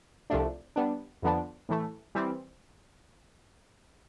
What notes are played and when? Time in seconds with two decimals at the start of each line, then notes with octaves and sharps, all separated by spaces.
0.30 C2 C3 F3 A3 D4
0.76 G3 B3 D4
1.22 F2 D3 F3 B3 D4
1.69 A2 E3 A3
2.15 E3 G3 C4